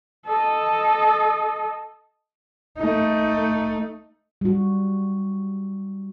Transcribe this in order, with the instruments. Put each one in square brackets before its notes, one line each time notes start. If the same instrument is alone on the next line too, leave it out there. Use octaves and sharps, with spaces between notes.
[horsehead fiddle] A4 D#5
[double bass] A3 D#4
[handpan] G3 F#4